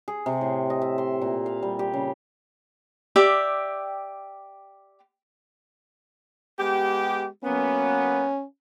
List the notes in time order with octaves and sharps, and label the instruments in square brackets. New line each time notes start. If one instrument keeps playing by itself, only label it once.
[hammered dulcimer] G#4
C3
A2
D#5
E5
C6
A#2
F5
G3
G4
C#3
[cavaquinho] G4 D5 E5 G5
[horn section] G#3 B3 G4
[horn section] F#3 A#3 B3 [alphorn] C#4